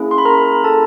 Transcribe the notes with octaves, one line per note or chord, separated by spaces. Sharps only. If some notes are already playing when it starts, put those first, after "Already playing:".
Already playing: A#3 C#4 E4 G#4
C6
B5
A#4 A#5
A4 A5